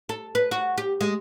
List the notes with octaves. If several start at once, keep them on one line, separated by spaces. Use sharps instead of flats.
A4
B4
F#4
G4
G#3